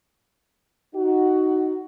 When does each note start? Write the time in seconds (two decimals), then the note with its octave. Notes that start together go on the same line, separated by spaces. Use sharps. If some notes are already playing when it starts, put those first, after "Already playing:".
0.95 D#4 F#4